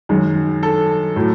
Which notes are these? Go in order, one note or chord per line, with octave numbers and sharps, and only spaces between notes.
F#2 D#3 G#3
A4
A2 F#3 A3